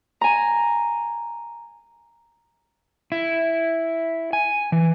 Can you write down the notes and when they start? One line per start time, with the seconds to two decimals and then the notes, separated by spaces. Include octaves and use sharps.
0.21 G#5 A#5
3.12 E4
4.33 G#5
4.72 E3